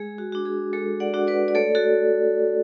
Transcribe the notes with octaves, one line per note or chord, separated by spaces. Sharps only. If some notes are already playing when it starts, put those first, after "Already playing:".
Already playing: G#3 G#4
F#4
D4 F#4
G#4
G#3 F#4 A4
D5 F#5
D4 F#4
B4 D5
D5
A3 A4 C#5
F#4 A4